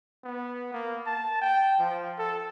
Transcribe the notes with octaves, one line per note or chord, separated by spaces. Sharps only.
B3
A#3
A5
G5
F3
A4